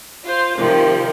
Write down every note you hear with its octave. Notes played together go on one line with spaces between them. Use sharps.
F4 C5
C3 D#3 F3 G3